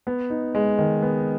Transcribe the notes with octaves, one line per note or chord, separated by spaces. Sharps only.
B3
D#4
G#3
D#3
B3